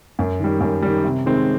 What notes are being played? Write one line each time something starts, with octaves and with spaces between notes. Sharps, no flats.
F#2
D#3 G3
F#2
D#3 G3
C3
D#3 G#3 C4